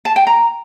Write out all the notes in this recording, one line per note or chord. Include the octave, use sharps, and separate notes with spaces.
A5
G5
A#5